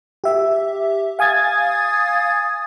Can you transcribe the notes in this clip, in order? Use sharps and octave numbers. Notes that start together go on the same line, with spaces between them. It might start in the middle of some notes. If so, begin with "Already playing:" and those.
G4 E5
F5 G#5 D#6 G#6 A6